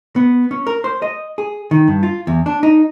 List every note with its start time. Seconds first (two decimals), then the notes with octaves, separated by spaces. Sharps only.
0.16 B3
0.51 C#4
0.67 A#4
0.84 C5
1.02 D#5
1.38 G#4
1.71 D#3
1.88 G2
2.03 F4
2.27 E2
2.46 D4
2.63 D#4